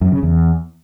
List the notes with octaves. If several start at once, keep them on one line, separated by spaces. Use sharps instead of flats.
F#2
C#3
E2